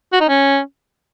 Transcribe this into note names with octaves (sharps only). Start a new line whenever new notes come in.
F#4
D#4
C#4